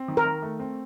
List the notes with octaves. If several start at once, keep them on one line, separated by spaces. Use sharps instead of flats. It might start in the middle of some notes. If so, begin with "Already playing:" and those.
Already playing: C4
D#3
A#4
D#3
A3
C4